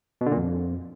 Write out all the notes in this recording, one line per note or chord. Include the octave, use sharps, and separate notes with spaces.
B2
D3
A#2
F2